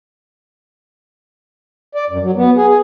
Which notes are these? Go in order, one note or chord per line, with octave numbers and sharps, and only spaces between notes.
D5
F#2
F#3
B3
G#4
G#4